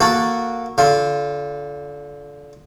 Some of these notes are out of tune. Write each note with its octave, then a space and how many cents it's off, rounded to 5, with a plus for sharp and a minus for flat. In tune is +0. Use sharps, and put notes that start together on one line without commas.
A#3 +0 F#4 -10 A4 +0
D3 -25 F4 +0